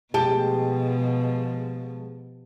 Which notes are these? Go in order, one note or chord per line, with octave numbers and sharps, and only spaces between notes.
B2 F3 G#3 G4 A5